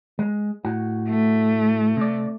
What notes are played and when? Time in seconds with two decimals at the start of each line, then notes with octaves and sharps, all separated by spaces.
0.19 G#3
0.65 A2 F#4
1.09 A3
1.97 C3 D5